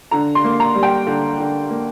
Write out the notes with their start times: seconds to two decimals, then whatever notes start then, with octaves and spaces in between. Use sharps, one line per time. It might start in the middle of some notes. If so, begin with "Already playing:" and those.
0.11 D3 A#5
0.35 C6
0.44 A#3
0.60 A#5
0.74 G3
0.83 G5
1.07 D3
1.39 D3
1.70 A#3